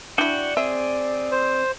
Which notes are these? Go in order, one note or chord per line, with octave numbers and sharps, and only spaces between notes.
D4 E4 F#4 D5 G5
C4 G#4 E5
C5